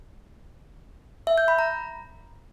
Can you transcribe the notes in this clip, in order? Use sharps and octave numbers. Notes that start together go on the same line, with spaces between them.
E5
G6
B5
A#5